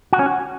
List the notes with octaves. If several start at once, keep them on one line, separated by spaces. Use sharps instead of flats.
F#4
C#4
F#4